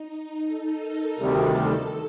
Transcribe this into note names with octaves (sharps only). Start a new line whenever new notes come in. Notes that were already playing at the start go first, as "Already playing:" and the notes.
Already playing: D#4
A4
A#4
D2 C3 D#3 G3 A4